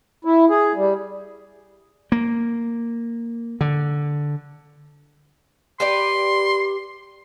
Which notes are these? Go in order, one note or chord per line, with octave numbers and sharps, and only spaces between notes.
E4
G#4
G3
A#3
D3
G4 B4 D5 C6